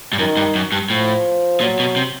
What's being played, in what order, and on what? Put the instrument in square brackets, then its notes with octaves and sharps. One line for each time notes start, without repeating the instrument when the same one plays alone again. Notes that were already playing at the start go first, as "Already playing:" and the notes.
[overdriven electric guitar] G2
[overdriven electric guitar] F#2 [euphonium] D#3
[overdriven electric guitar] G2
F#2
G2
[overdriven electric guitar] A2 [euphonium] F3
[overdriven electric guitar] A#2 [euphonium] F#3
[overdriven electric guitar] B2
C3